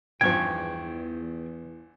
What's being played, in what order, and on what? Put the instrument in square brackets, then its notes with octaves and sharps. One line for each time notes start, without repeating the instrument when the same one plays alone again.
[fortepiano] G#1 G2 F3 [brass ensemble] E2 [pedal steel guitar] G5 C#6 [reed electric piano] G#6